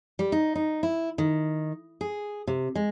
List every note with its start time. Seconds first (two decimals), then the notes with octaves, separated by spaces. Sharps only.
0.19 G3
0.32 D#4
0.55 D#4
0.83 E4
1.18 D#3
2.01 G#4
2.47 C3
2.75 G#3